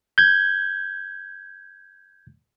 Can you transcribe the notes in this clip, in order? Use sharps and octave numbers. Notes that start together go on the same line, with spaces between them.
G6 G#6